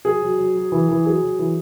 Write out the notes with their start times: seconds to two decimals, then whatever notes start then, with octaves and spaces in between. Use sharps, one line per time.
0.05 F#3 G#4
0.22 F#3
0.38 F#3
0.55 F#3
0.72 E3
0.89 E3
1.05 F#3 G#4
1.22 F#3
1.39 E3